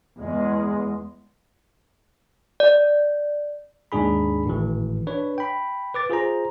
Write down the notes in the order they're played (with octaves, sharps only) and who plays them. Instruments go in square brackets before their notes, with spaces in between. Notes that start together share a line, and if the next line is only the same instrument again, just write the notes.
[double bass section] E2 G#3
[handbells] D5
[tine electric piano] D#2 G#2 D4 G#4 B5
G#1 A2 E3
D4 B4 C#5
G5 B5
B4 D6 A6
F4 G#4 C5 A#5